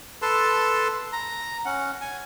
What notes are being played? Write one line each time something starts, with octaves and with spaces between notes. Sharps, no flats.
A4 B4 A5 C6
A#5
C#4 F#5
G#5